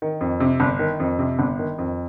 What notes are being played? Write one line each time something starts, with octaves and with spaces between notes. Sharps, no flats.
D#3
F2
C3
G1
D#3
F2
C3
G1
D#3
F2